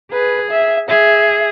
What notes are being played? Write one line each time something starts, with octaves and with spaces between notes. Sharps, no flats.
G#4 B4
E5
G#4 E5